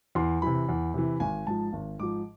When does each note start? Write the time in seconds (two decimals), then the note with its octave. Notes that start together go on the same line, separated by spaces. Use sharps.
0.15 E2 C6
0.42 C3 E3 B5
0.68 E2
0.94 C3 E3
1.20 G#1 G#5
1.46 G#2 F3 A5
1.73 G#1
1.99 G#2 F3 D6